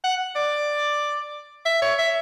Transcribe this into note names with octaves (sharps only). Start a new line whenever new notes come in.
F#5
D5
E5
C#5
E5